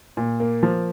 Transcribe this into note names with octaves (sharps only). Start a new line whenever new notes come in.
A#2
A#3
F3